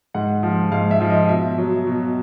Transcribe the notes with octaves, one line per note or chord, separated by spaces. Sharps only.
G#2 F#5
F3
G#2 F5
E5
F3
D#5
B2 E5
F#3
B2